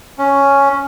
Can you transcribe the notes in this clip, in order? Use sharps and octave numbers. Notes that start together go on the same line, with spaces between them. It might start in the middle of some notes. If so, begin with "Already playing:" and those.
C#4